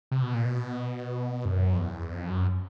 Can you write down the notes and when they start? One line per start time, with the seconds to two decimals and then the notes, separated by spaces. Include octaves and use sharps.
0.11 C3
0.22 B2
0.34 A#2
0.45 B2
1.45 F#2
1.74 F2
1.79 E2
2.12 F2
2.29 F#2